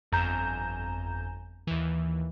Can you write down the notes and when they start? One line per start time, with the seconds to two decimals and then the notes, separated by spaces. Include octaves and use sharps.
0.12 G1 F2 G#5 A#5 G6 E7
1.67 D#2 E3